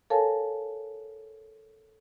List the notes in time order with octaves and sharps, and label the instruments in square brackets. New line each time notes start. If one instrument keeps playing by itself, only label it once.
[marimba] A4 A#4 C#5 F5 G#5 A5